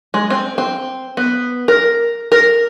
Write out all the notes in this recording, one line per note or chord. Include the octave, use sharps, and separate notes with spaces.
G#3
C4
C4
B3
A#4
A#4